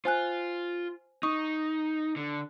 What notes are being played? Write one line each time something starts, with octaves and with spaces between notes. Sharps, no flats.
F4 C5 G#5 F#6
D#4 C#6 D#6
D3